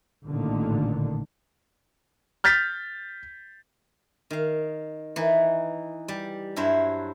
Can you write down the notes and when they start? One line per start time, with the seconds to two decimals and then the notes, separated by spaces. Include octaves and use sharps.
0.24 A1 A#2 D3 D#3
2.44 F6 G6 A6 B6
4.30 D#3 F5
5.16 E3 D#4
6.08 G3
6.56 G2 F#3 E4 C5